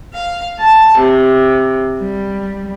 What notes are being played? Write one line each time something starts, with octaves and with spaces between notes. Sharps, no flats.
F5
A5
C3
G3